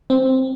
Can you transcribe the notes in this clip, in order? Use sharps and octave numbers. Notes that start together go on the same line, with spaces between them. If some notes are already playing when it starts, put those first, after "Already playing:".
C4